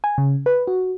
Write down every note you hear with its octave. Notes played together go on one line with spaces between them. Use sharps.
G#5
C#3
B4
F#4